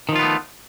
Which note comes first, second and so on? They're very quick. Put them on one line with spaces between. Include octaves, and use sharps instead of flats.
D#3 F3 F4 B3 A3